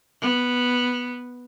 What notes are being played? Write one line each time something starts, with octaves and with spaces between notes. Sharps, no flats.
B3